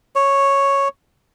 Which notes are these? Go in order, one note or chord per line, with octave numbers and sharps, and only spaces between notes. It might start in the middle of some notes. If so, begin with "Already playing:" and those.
C#5